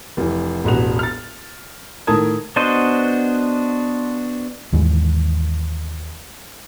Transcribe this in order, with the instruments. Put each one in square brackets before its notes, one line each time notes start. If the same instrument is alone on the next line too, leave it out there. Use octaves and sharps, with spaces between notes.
[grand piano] F1 E3
E1 A1 F#4 F7
F6 A6
A2 D#3 A#4 A5 D#6 G#6
[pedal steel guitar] B3 D4 F#4 C5 D#5
[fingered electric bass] D#2 G#2 E3